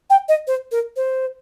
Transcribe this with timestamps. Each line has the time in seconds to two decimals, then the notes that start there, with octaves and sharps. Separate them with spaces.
0.10 G5
0.29 D#5
0.47 C5
0.72 A#4
0.96 C5